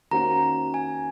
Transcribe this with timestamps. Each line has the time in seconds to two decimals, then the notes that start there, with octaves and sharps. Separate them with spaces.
0.11 D#3 A#3 C#4 F#4 C5 A#5
0.74 G#5